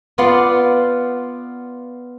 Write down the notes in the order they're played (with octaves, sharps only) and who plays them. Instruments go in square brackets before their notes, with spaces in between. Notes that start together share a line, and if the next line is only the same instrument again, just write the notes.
[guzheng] B3 F4 D5 F5 F#5 C6